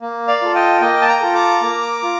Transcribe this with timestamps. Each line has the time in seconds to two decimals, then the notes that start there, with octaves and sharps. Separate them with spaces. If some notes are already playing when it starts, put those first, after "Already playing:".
0.01 A#3
0.28 D5 F5
0.42 F4 A4
0.55 D#5 G5
0.81 A#3 D#5 G5
1.01 A5
1.08 G5 A#5
1.21 F4 A4
1.34 A#5 D6
1.61 A#3
2.02 F4